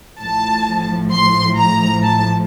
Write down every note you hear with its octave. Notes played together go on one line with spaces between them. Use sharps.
A1 A2 F3 A5
C6
A#5
A5